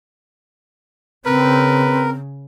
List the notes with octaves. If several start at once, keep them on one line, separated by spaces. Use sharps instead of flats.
C#3 C4 A#4 B4